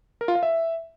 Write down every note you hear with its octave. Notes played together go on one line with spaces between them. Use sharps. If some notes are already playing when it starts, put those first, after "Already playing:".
A#4
F4
F5
E5